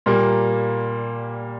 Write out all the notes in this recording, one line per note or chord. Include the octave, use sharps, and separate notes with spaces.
A#2 G3 A#3